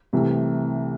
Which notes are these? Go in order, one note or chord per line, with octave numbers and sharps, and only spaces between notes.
C2 C3 E3 A3